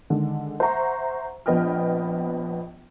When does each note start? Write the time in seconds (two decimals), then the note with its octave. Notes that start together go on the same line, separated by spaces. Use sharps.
0.10 D3 D#3 G#3
0.60 C5 E5 F#5 A#5 C#6
1.46 A#1 F3 B3 D#5 G5 F6